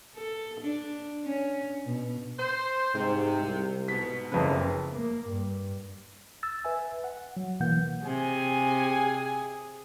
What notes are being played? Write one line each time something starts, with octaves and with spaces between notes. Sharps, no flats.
A4
D4
C#4
B2
C5
G#2 C3
C2
G#2 B2 B6
F#1 F2 C#3 B4
A#3
G2
E6 A6
B4 E5 G#5
F#5
F#3
B2 E3 A#3 F#5 G6
C3 G#4 G#5